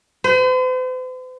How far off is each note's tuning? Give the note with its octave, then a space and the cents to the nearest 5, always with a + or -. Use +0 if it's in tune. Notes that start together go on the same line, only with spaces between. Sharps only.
C5 -45